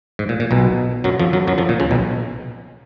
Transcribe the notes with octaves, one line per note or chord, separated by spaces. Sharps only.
G#2
A#2
A#2
B1 B2
F#2 F#3
F2 F3
F#2 F#3
F#2 F#3
F2 F3
A#2
C#2 C#3
B1 B2